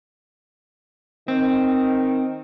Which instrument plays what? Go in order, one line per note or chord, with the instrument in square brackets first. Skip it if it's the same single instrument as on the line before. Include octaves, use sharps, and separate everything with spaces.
[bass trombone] D#3 [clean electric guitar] C4